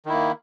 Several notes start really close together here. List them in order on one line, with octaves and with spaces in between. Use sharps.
D#3 E4 A#3